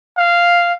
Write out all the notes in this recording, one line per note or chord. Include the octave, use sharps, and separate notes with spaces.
F5